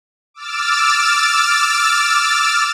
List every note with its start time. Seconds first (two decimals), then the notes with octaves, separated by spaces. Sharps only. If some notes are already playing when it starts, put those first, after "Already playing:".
0.34 D6 E6 F6 A6